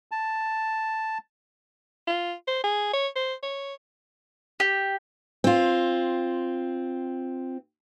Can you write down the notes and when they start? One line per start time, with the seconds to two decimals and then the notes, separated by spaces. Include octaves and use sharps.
0.11 A5
2.08 F4
2.47 C5
2.64 G#4
2.94 C#5
3.16 C5
3.43 C#5
4.60 G4
5.44 C4 F4